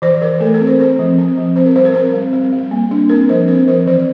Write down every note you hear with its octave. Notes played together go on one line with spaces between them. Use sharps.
E3 C5
E3 A#4
A3 A4
A#4
C4
C5
C4 C5
F3
C4
F3
C4 C5
A#4
G3 C5
A#4
C4 C5
G3
G3
G3
A#3
D4
C4 A#4
F3 C5
C4 A#4
F3 C5
E3 C5